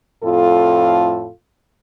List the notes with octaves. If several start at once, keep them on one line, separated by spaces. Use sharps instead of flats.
F2 A2 F4 A4